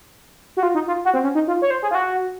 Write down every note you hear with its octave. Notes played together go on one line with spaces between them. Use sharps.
F#4
F4
D#4
F4
F#4
C4
C#4
D#4
F4
C#5
C5
G#4
F4
F#4